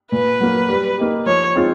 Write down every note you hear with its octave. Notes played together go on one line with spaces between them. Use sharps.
A#2 B4
F#3 A#3
G3
A#3 D#4 G4
F3 C#5
G#3 C4 F4